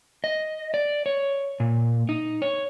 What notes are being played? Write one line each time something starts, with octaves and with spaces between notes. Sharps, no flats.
D#5
D5
C#5
A#2
D#4
C#5